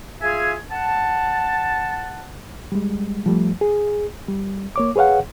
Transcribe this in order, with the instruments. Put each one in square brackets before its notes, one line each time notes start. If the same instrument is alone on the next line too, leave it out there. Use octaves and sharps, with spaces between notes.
[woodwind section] F4 G#4 E5 F5 G#5
F#5 A5
[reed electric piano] G3 G#3
F3 G3 A3
G#4
G3
A#3 C#5 D6
G#4 B4 C#5 F5 F#5